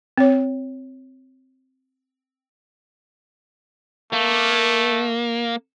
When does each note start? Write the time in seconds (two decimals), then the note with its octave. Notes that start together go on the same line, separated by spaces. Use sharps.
0.18 C4 C#5
4.13 A3 A#3